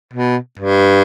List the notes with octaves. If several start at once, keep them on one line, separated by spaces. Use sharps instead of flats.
B2
G2